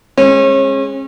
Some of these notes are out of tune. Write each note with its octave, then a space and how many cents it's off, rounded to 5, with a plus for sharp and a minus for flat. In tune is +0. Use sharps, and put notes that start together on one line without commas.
G#3 +0 C#4 -35